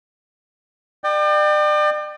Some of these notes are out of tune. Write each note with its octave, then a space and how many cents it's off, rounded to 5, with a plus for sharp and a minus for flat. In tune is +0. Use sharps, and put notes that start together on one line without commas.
D5 +40 G5 +0